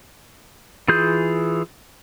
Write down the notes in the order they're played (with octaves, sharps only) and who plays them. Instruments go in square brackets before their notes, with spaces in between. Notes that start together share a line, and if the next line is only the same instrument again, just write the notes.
[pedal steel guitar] E3 F4 G#4 G6